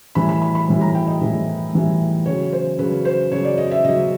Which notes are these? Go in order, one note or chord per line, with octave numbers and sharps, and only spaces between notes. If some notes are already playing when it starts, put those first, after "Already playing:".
A2 E3 G3 B5
B5
B5
B5
A2 E3 G3
A#5
G5
D#5
A2 E3 G3
A2 E3 G3
C#3 F#3 C#5
C5
C#3 F#3 B4
C5
C#3 F#3 C#5
D5
D#5
E5
C#3 F#3 D#5